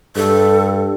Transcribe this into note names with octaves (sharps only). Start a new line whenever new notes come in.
G2 A4